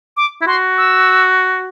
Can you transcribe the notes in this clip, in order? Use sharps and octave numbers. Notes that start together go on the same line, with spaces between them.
D6
E4
F#4 C6
E6